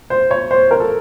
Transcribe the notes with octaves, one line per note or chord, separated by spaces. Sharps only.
C5
C#5
C5
A#4
A4